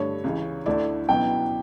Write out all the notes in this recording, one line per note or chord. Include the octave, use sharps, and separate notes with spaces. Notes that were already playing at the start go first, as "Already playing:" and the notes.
Already playing: G2 D3 A3 C#5
C#2 C#3 E3
D2 D3 A3 E4 D5
C#2 B2 F#3 B3 E4 G5